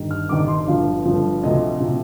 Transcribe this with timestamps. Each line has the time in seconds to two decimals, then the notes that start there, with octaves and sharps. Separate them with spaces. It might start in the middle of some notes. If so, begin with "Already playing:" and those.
Already playing: G1 G2 D#3 G3
0.11 F6
0.29 G1 G2 D#3 G3 D6
0.48 C6
0.67 G1 G2 F3 F5
1.05 G1 G2 F3
1.43 D2 C3 F3 D#5
1.80 C3 F3